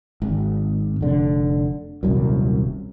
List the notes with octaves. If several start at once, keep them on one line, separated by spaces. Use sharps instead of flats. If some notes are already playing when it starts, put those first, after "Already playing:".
G#1
F1 D3
D#1 C2 F#2